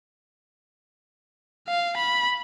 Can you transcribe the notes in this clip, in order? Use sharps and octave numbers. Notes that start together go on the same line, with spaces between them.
F5
B5